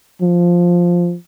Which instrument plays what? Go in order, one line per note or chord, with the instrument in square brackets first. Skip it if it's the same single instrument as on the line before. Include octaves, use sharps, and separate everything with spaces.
[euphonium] F3